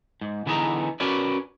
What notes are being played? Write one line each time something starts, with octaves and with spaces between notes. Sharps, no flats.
G#2
D3 E3 B3 D#4 G#4 A#5
C#4 F#4 A#4 B4 C#5 D5